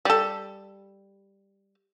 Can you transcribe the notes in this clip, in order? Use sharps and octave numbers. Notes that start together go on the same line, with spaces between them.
G3 A4